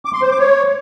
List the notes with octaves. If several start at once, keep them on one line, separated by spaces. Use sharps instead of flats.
D6
C6
C5
D6
C#5